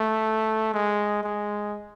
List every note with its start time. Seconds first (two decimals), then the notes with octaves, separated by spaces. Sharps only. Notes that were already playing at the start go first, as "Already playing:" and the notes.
Already playing: A3
0.74 G#3
1.23 G#3